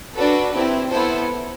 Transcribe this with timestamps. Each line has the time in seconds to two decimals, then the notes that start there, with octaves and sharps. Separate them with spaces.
0.14 D4 F#4 A4 B4
0.52 C4 E4 G4
0.89 B3 E4 A4 C5